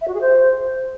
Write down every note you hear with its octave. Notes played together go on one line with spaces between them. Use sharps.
E5
F#4
G#4
C5